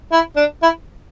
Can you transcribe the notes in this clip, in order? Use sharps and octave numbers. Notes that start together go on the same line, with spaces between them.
E4
D4
E4